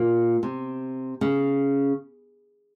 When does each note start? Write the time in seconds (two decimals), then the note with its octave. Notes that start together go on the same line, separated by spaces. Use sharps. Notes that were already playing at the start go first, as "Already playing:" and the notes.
Already playing: A#2
0.43 C3
1.21 C#3